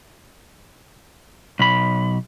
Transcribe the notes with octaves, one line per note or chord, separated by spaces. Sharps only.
B1 B5